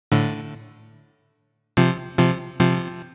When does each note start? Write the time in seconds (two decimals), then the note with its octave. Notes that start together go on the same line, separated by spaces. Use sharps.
0.12 A2 D3
1.77 C3 F3
2.18 C3 F3
2.60 C3 F3